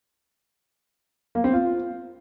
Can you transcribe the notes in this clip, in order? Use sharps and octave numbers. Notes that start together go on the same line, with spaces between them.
A#3
C4
F4